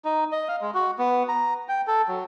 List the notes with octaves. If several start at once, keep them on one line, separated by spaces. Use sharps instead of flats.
D#4
D#5
F5
G#3
F#4
B3
A#5
G5
A4
F#3